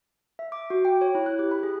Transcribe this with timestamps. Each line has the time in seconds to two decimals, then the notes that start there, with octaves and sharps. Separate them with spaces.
0.39 E5
0.52 D6
0.70 F#4
0.85 G5
1.01 C#5
1.15 E4
1.26 F#6
1.39 G4
1.51 B5
1.63 G#4